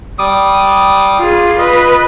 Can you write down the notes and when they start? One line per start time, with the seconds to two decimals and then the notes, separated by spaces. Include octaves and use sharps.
0.19 G3 D6 D#6
1.19 F4 G#4
1.59 B4 D#5